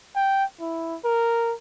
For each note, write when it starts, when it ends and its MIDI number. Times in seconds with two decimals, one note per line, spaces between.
0.15 0.44 79
0.61 0.97 64
1.05 1.54 70